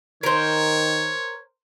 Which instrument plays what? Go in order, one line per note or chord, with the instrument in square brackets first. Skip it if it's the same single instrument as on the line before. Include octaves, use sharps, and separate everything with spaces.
[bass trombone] D#3 [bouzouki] A#4 C5 [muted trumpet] C#5